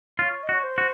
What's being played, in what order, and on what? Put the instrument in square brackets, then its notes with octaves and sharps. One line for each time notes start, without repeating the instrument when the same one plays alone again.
[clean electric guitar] F4 [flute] C#5
[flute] D#5
[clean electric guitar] F#4
[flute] C#5
C5
[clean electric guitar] F#4